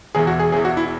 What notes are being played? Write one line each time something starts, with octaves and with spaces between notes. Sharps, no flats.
E1 E2 E3 G#4
F#4
G#4
E1 E2 E3 G#4
F#4
E4